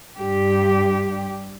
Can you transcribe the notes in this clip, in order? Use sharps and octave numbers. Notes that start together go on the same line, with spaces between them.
G2 G4